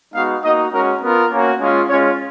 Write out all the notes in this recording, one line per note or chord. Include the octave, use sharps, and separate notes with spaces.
G#3 B3 D#4 F#4 F5
A#3 D#4 F#4 D#5
G#3 C#4 F#4 A#4
B3 F4 A#4
A#3 C#4 F#4
G#3 C#4 F4
G#3 C#4 F4 C#5